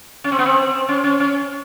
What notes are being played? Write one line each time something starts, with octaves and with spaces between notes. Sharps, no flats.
C#4
C4
B3
C4
C#4
C#4
C#4